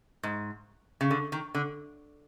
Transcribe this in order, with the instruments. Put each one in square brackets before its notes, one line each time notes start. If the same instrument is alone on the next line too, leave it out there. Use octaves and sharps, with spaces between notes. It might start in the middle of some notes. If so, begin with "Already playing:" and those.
[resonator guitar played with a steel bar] G#2
C#3
D3
D#3
D3